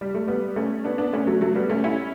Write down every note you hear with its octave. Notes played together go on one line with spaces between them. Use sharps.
G3
A3
G3 B3
A3 C#4
B3 D4
B3 D4
A3 C#4
F#3 A3
F#3 A3
G3 B3
A3 C#4
C#4 E4